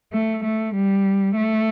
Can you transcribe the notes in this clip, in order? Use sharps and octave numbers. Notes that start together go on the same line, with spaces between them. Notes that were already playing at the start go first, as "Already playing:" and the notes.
A3
A3
G3
A3